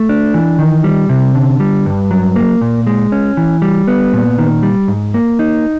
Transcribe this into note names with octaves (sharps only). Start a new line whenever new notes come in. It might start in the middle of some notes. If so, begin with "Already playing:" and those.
Already playing: A3
D4
E3
D#3
G3
C3
D3
G3
G2
F#3
A#3
A#2
G#3
C#4
E3
G3
B3
A#2
D#3
G3
G#2
A#3
D#4